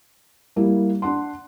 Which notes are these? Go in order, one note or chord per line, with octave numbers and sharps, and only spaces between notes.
G3 A#3 E4
D4 F#5 C6